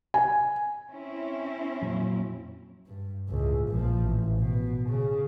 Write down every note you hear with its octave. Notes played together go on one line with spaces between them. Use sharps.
G#5
C4 C#4 E4
F2 A#2 F#3
G2
C#2 A2
A#1 F3
A1
B2
C#3